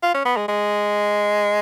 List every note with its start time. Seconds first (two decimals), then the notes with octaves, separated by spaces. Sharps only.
0.03 F4
0.14 C#4
0.25 B3
0.37 G#3
0.48 G#3